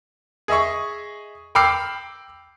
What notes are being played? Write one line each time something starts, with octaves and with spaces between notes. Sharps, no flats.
G#4 D#5 E5 C#6
G5 B5 D6 E6 F6 C7